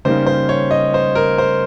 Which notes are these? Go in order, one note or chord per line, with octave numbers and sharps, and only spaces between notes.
C#3 G3 A#3 D#4 C5
C5
C#5
D#5
C5
A#4
C5